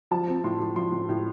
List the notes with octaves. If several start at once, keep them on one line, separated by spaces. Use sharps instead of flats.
F3 A5
C4
A2 C6
A2
F3 C6
A2
A2